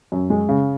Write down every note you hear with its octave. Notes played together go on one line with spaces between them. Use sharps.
F#2
G#3
C#3